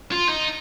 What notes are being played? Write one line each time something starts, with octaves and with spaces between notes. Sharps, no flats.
F4
D#4